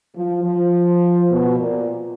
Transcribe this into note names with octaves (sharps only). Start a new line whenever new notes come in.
F3
F3
B2
A#2